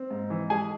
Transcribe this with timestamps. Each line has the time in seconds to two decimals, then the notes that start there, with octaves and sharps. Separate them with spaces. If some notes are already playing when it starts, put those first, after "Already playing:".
Already playing: C4
0.11 G#2
0.30 E3
0.50 G#3 G#4 G#5